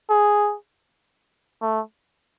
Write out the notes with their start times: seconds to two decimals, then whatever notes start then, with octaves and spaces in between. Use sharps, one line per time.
0.10 G#4
1.62 A3